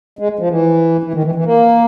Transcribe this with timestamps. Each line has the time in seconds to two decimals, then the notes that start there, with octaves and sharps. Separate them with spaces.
0.19 G#3
0.39 F3
0.50 E3
1.03 E3
1.13 D#3
1.24 E3
1.35 E3
1.45 A#3